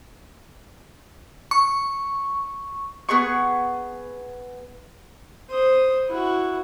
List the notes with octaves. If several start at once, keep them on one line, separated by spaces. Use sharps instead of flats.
C#6
B3 G#4 C#6
C5 D#6
E4 F#4